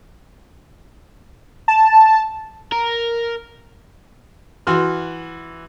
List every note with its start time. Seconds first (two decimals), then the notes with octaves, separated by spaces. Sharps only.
1.68 A5
2.72 A#4
4.67 E3 F#4 C6 F6